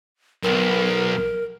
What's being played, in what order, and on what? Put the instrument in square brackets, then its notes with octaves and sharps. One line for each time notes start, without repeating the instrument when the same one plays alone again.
[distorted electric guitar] B1 [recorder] A#4